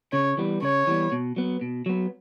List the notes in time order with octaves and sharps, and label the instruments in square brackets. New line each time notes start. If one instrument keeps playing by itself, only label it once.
[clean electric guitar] C#3 [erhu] C#5
[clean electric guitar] E3 G3 B3
[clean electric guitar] C#3 [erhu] C#5
[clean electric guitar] E3 G3 B3
B2
F#3 B3
B2
F#3 B3